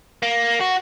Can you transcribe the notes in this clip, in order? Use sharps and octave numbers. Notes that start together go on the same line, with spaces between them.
A#3
F#4